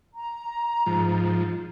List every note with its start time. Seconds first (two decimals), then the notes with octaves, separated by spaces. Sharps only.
0.16 A#5
0.86 G#2 F3